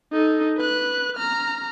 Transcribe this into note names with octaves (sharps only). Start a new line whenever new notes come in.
D#4 A4
B4 F#6
A#5 F6